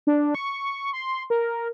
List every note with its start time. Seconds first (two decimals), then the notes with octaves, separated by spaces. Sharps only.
0.07 D4
0.35 C#6
0.93 C6
1.30 A#4